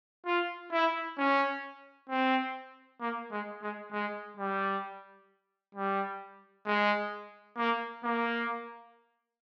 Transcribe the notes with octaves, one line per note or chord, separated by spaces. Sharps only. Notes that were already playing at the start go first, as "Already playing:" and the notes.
F4
E4
C#4
C4
A#3
G#3
G#3
G#3
G3
G3
G#3
A#3
A#3